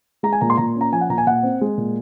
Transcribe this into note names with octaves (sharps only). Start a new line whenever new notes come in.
G#3 A#5
G#5
A#2 A#5
C6
A#2 A#5
C#4
A#5
F3 G#5
F#5
A#2 A#5
G#5
A#2 F#5
C4
G#3
A#2